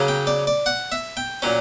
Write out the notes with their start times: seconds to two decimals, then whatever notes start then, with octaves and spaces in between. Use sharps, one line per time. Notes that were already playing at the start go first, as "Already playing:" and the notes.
Already playing: C#3 F#3 A#3 C#4
0.08 G5
0.27 D5
0.47 D5
0.66 F#5
0.92 E5
1.17 G5
1.42 A#2 F#3 C#4